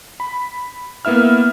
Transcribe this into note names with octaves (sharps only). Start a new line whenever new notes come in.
B5
A#3 B3 E4 E5 F6